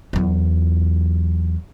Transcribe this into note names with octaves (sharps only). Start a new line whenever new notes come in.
E2 F#3